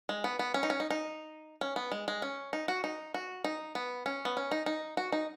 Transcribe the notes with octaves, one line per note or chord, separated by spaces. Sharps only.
G#3
B3
B3
C#4
D#4
C#4
D#4
D#4
C#4
B3
G#3
G#3
C#4
D#4
F#4
D#4
F#4
D#4
B3
C#4
B3
C#4
D#4
D#4
F#4
D#4